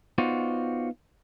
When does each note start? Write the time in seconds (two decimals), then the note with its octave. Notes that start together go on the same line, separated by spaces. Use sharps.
0.18 B3 D#4 F4 F#4 C5 D5